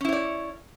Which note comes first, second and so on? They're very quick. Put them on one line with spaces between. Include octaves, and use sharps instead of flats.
C#4 E4 C#5 D5